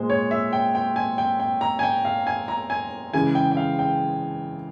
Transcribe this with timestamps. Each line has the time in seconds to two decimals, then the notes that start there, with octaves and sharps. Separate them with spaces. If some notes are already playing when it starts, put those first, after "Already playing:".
Already playing: A#2 G#3 C5
0.10 C#5
0.31 E5
0.53 G5
0.75 G5
0.96 G#5
1.18 G5
1.40 G5
1.61 A#5
1.79 G#5
1.83 G5
2.05 F5
2.27 G#5
2.48 A#5
2.70 G#5
3.13 C#3 E3 G#3 G#5
3.35 G5
3.51 G5
3.57 F5
3.79 G5